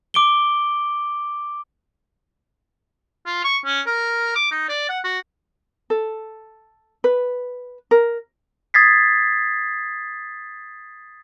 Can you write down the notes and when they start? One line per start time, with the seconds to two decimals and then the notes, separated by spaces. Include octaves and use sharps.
0.14 D6 D7 G7
3.26 F4
3.44 C#6
3.66 C#4
3.87 A#4
4.36 D6
4.51 D#4
4.69 D5
4.89 F#5
5.04 F#4
5.90 A4
7.04 B4
7.91 A#4
8.74 D#6 G#6 A6 B6 C7